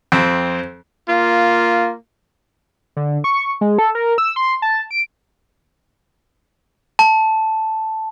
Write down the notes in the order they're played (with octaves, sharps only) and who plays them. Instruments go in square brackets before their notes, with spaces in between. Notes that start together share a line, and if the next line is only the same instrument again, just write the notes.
[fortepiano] F2 C4
[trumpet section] A#3 F4
[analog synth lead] D3
C#6
G#3
A4
A#4
E6
C6
A5
D7
[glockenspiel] A5